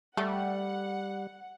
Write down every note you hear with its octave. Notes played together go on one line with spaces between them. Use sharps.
G3 A3 F#5